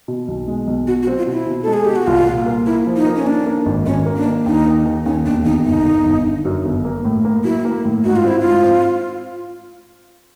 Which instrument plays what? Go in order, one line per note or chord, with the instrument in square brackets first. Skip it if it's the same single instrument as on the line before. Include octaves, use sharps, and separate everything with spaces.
[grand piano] B2
B1
G#3
B1
[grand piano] B2 [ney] F#4
[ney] F#4
[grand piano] C4
[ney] F4
[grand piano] B2
[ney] E4
[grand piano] B2
[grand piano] G#3 [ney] A4
[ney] G#4
[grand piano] B2 [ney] G4
[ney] F#4
[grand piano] C2 [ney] F4
[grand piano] A#2
A#3
[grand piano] A#3 [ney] E4
[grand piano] F3
[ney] D#4
[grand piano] A#3
[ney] C#4
[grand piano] A#3 [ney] D4
[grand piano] A#3
G#1
[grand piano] G#1 [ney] C#4
[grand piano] A#3
[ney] D4
[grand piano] A#3
[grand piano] D#2 [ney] D#4
[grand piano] D#3
D#3
[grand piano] D#2 [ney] C#4
[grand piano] E1 [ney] D4
[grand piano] E1 [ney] D#4
[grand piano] G1 [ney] D#4
[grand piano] G1
G1
D3
F#2
G1
A#3
A2
A#3
[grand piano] F#3 [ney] E4
[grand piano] A#3
A2
[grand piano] G#2 [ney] F#4
[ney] F4
[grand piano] C4 [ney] E4
[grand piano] G#2 [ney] F4
[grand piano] C4